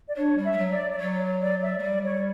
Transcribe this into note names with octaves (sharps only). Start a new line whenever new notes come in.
D5
D4 C#5
G3
E5
G3
F#3
D5
D5
F#3 C#5
D5
E5
A3
G3 D5
C#5